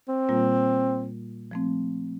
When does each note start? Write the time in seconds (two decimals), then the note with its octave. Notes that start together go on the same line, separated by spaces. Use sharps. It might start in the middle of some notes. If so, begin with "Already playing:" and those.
0.08 C4
0.29 A#2 G3 A#3 F4
1.51 F3 A3 C4